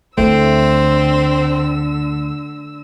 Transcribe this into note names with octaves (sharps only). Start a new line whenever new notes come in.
D2 D3 A3 C4 E4 E6